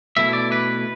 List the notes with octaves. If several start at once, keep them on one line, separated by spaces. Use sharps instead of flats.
B2 A3 E4 E5
D5
B4